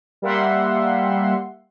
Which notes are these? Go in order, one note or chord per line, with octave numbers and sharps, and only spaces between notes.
G3 A#3 E5 F#5 C6